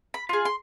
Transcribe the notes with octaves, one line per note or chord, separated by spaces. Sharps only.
B5
F4 G#4
C6